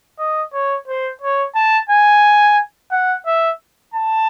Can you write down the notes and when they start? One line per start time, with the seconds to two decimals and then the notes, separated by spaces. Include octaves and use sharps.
0.19 D#5
0.53 C#5
0.88 C5
1.22 C#5
1.55 A5
1.89 G#5
2.91 F#5
3.26 E5
3.94 A5